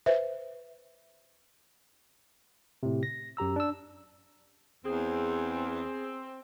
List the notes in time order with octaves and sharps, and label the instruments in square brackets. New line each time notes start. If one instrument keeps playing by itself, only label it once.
[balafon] B4 C5 E5
[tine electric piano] A2 C3
A#6
F#2 G4 A#5 E6
D4 E6
[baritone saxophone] E2 [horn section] C4 [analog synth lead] G#4